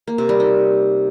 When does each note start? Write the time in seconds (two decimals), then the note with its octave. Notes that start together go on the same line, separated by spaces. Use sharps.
0.07 A#3
0.18 C3
0.29 G3
0.40 D#4